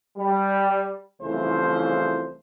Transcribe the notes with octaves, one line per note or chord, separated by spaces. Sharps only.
G3
C2 C#3 E3 F3 A3 C5